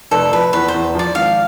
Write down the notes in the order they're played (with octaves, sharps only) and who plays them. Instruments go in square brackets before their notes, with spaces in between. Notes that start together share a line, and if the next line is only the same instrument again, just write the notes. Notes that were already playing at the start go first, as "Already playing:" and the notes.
[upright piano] F1 [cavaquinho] A4
[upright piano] F3 [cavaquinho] B4
[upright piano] E2 [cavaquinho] B4
[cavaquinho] C5
[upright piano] E2
[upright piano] F3 [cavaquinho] D5
[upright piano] G#1 [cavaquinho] F5